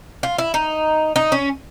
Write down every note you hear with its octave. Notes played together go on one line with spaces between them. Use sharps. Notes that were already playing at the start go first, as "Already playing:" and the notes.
F4
E4
D#4
D#4
C#4